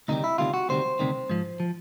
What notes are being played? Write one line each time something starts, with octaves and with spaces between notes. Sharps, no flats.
D2 C3 D#3 G3 D#4
E4
D2 C3 D#3 G3 F4
F#4
D2 C3 D#3 G3 C5
D2 C3 D#3 G3
G#2 F3
F3